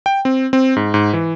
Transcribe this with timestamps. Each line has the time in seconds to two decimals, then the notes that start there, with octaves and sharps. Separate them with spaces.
0.06 G5
0.25 C4
0.53 C4
0.76 G#2
0.94 G#2
1.13 E3